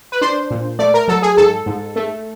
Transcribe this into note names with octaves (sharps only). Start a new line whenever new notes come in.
B4
D4 C5
A#2
A3 D5
A#4
F#3 A4
G#4
G#2 A4
G#2
A3